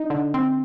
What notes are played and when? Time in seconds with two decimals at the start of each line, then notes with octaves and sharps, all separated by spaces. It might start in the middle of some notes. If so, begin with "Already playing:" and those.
Already playing: D#4
0.10 D3
0.34 C4